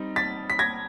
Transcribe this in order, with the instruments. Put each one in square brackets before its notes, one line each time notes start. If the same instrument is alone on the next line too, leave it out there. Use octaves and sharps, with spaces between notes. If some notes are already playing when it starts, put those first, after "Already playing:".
Already playing: [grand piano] G3 C4 D#4
A6 B6
B6
G#6 A#6